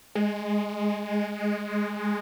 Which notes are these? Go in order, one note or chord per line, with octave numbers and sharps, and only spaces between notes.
G#3